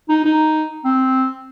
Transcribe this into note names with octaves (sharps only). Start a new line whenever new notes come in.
D#4
D#4
C4